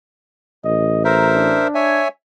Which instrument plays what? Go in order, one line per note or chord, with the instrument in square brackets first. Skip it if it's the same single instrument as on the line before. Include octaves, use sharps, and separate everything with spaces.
[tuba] A1 [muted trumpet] D#5
[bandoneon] A#4 C5 E5 [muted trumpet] A#5
[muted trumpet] D4
[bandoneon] C#5 E5 G#5